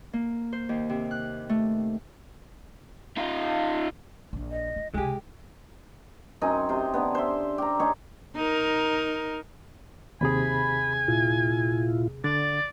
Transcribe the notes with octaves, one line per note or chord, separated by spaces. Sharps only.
A#3
C5
D#2
C3
F#6
A3
D#4 F4
A#1 D4
D#5
E4
C#2 C3 G#3 G4 G#5
F#2 C4 D#4 G#5
C3 C5
D3 B3
C5 E5
G4 A#5
D#4 G4 G#4 C#5
D#4 A#4
D#2 C3 G#4 G#5 B5
A#2 E4 F4
D3 D5 A6